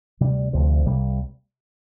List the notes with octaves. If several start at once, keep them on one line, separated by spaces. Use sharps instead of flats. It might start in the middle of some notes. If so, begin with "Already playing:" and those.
D2 C3 G3
D2 C3 F3
C2 C3 G3 A#3